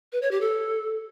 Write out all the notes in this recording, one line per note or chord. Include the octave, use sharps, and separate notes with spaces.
B4
C#5
G4
A4